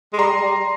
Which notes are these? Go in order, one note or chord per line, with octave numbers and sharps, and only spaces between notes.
G#3
G3 A#5 C6
G3